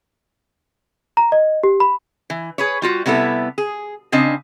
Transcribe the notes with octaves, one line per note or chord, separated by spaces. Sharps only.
A#5
D#5
G4
B5
E3
G#4 B4 C#5
G3 F4 F#4
C3 G3 B3 E4 A4
G#4
C#3 C4 D4 D#5